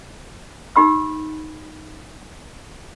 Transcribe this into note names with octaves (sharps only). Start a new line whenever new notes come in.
D#4 G4 B5 E6